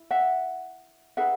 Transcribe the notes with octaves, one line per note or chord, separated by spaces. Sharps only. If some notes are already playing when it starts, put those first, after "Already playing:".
Already playing: E4
E5 F#5
D#4 G#4 B4 E5 F#5